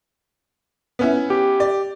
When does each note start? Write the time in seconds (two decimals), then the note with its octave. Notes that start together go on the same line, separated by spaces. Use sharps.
0.99 B3 C#4 E4
1.30 G4
1.60 D5